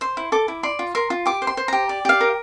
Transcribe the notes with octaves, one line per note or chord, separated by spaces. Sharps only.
C5 C6
E4
A4 D6
E4
D5 C6
F4
A#4 C6
F4
G4 D6
C5
C6
C5
G4 A#5
D5
G4 F5
A#4